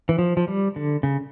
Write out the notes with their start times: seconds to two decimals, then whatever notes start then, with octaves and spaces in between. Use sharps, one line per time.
0.09 E3
0.19 F3
0.37 F3
0.48 G3
0.76 D3
1.03 C#3